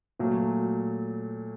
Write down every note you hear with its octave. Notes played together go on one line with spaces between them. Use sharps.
A#2 F#3 A3